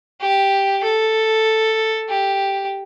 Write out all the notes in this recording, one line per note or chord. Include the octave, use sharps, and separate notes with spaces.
G4
A4
G4